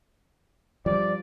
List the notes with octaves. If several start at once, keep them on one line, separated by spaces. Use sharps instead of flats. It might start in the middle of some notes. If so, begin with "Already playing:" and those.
G2 F3 G3 D5